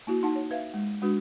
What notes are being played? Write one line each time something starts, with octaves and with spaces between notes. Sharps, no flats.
A#3 E4 F#4
D#4 F#5 A5
C#5
B4 E5 F5
G#3
G#3 D4 F#4 B4